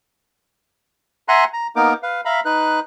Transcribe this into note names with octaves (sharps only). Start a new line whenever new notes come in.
E5 F#5 G#5 A#5 C6 F#6
A#5
A#3 B3 D#4 A#4 D6
B4 F5
E5 F5 A#5 B5
D#4 B4 F#6